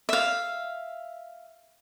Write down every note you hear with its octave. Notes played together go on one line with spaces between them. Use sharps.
E5 F5